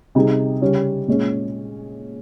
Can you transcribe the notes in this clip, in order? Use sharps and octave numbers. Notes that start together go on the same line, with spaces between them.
C3 G3 C4 D#4 G#4
C#3 G3 C#4
A#2 G#3 C#4